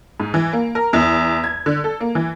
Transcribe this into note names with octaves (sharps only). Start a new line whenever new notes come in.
G#2
E3
A#3
A#4
E2
G#6
D3
A4
A#3
E3